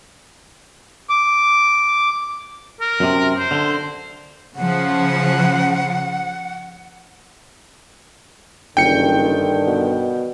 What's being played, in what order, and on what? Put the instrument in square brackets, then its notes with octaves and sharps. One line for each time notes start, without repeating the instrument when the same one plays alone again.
[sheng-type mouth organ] D6
[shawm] A#4
[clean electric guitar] F#2 C3
[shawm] C5
[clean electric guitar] D3
[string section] C#3 F3 [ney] F#5
[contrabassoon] F#1 [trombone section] G2 D3 D#3 [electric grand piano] G5 C#7
[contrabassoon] B2